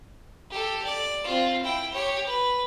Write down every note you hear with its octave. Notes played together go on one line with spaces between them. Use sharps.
G4 A4
D5
C4 F4
E4 G5
G4 C#5
B4